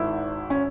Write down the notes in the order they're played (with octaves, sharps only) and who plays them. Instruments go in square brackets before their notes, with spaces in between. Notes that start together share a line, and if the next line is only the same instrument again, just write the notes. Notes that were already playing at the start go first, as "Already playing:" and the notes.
Already playing: [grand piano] G#1 G#2 D#3 E4
C#4